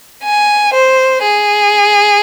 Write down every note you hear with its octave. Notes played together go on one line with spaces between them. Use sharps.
G#5
C5
G#4